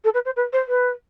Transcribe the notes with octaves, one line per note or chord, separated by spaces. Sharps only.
A4
B4
C5
B4
C5
B4